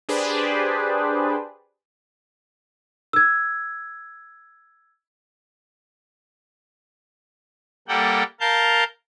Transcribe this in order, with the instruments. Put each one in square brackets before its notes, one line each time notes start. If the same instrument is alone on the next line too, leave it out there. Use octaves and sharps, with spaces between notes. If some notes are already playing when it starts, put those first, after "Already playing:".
[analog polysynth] D4 G4 G#4 B4 C5 D5
[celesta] E6 G#6
[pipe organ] G3 A#3 A4 F#5 G5
A#4 F5 A5 G6